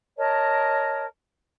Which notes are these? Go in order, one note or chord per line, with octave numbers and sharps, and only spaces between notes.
A#4 C#5 D#5 A5